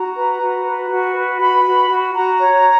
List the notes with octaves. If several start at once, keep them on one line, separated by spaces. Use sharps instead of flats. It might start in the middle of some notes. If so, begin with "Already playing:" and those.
Already playing: F#4 A#5
B4
F#4
B4
F#4
B4
F#4 B5
F#4
F#4
F#4 A#5
C#5